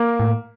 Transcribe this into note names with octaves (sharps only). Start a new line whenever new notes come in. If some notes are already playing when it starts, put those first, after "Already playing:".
Already playing: A#3
A2